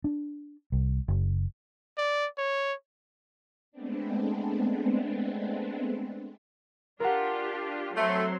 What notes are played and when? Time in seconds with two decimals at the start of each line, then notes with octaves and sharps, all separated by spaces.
0.04 D4
0.72 C2
1.08 F#1
1.98 D5
2.38 C#5
3.72 G#3 A3 B3 C4 D4
7.00 D4 F4 G4 A#4 F#5
7.96 F#3 A3 C4 C6